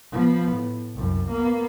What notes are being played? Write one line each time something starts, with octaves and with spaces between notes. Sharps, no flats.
F3 B3
A2
C2 F#2
A#3 B3